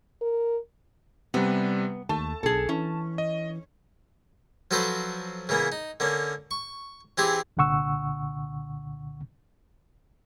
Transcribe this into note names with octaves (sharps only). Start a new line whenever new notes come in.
A#4
C3 G3 B3
D#2 A3 A5
B1 G#4 A4
E3 C#4
D#5
F3 F#3 F#4 A4 B4 C5
C#3 E3 A#3 B3
D#4
D3 A#3 C#4
C#6
E3 C4 G4 G#4 C5 D6
C2 A#2 D3 F#5 C#6 E6